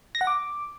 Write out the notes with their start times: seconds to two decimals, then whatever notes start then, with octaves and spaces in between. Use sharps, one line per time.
0.15 A#6
0.21 F#5
0.27 D6